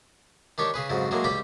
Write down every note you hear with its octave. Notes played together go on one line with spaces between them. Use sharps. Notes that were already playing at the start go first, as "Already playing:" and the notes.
D#3 D4 G4 C#5
C#3 G#4 B4
F2 G#2 C#3 F#3
A2 F#3 G#3 A#3
C#2 G3 G4 G5 B5